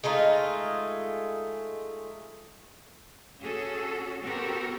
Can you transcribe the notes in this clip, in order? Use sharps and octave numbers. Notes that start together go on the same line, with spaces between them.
G#3 A3 D#4 F4
C#4 F#4 G#4 A4
B3 C4 F#4 G4 A4 A#4